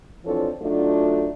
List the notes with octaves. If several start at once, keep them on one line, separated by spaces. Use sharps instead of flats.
E3 F3 C4 D4 A4 C#5
F#3 A3 D4 D#4 F4 F#4